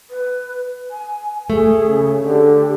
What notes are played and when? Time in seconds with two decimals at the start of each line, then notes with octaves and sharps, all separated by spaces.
0.10 B4
0.91 G#5
1.50 A3 G#4
1.87 C#3
2.24 D3 G4